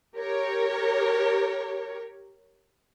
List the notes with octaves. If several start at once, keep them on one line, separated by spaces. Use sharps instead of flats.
G4 A#4 C#5